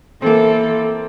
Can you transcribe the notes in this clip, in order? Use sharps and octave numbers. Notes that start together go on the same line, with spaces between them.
E3 A#3 C4 A4